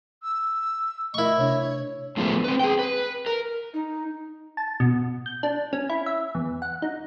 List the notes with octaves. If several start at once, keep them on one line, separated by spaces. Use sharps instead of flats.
E6
A3 E4 A#4 D#5 C#6
C3 D4 C#5
A2 D3 F3 G#3 A3 B3
C4 B4
G#4 G5
B4
A#4
D#4
A5
B2
G6
D4
C#4
E4
E5
E2
F#5
D#4